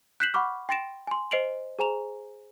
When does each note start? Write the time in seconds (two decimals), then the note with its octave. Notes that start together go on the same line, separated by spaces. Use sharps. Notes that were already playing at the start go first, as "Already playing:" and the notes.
0.20 F#6 G6 B6 C7 E7 F#7
0.34 F#5 B5 C#6 D6 F6
0.69 G5 C6 A6 A#6 D7 E7
1.07 G#5 C6
1.31 C5 D#5 C7 D7 F7 F#7
1.79 G#4 C5 G#5 A#5 E7 F7